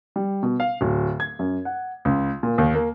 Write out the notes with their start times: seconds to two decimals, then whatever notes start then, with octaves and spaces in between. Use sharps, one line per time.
0.16 G3
0.43 B2
0.60 F5
0.81 D1
1.20 G#6
1.39 F#2
1.65 F#5
2.05 C#2
2.43 A#2
2.58 D#2
2.75 A#3